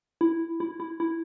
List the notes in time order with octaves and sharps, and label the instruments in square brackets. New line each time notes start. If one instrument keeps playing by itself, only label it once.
[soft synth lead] E4
E4
E4
E4